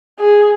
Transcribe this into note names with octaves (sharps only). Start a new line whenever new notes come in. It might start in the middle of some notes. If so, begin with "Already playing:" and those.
G#4